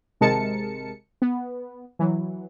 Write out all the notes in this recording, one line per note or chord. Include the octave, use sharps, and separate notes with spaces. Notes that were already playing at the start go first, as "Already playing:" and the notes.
G#1 C3 G#3 A#4 A5 C#7
B3
E3 F#3